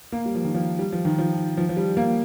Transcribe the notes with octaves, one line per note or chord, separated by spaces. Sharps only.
A#3
G3
F3
D#3
F3
G3
F3
D#3
F3
F3
F3
G3
A#3